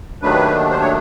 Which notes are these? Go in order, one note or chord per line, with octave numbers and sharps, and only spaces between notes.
D#2 D#3 F#3 A3 D4 B4
C5
C#5